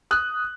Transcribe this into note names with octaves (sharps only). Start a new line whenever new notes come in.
D#6 F#6